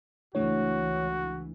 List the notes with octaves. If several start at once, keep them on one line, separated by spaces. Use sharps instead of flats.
C#2 E3 A3 D4 E4 F#4 C#5